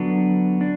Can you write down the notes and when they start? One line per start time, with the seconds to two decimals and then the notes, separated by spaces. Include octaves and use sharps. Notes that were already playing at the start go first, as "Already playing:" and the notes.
Already playing: D3 F#3 B3 D4
0.61 D4